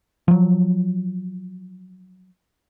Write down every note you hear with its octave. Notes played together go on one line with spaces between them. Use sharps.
F3 F#3